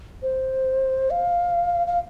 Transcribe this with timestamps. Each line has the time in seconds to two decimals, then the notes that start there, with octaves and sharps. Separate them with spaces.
0.22 C5
1.11 F5
1.87 F5